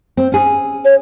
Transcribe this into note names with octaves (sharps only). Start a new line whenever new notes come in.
C4
C#4 G#4
C#5